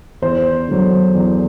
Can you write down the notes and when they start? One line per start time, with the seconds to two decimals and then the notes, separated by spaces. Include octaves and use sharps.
0.22 E2 C5
0.68 D3 F#3
1.15 E2